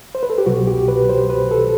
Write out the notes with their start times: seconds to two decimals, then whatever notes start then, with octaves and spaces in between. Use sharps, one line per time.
0.15 C5
0.23 B4
0.30 A4
0.38 G4
0.46 C2 B2 F#3 F#4
0.67 G4
0.88 B4
1.09 C5
1.30 B4
1.51 A4